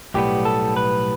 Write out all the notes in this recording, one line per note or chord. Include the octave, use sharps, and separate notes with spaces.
B1 A2 G3 B3 G4
A4
B4